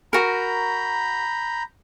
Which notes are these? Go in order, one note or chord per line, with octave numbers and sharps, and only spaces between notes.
F#4 A#4 A#5 B5 G6